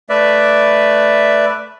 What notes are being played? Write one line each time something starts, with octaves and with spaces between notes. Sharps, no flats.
A3 B4 D5 E5